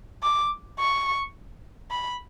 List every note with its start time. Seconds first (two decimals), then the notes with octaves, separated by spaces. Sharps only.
0.23 D6
0.80 C#6
1.91 B5